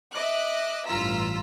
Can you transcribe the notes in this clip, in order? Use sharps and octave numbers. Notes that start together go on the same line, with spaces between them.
D#5 E5 D6 F#6
A1 G2 F4 A#5 E6 B6